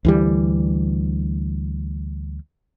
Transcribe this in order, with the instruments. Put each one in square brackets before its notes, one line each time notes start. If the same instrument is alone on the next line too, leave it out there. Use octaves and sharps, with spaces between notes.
[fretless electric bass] D2 E3 G3